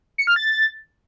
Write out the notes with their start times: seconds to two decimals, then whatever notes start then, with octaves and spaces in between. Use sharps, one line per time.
0.18 C#7
0.27 F6
0.36 A6